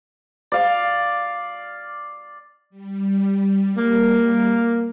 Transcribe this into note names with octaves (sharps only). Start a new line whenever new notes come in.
D5 F5
G3
A#3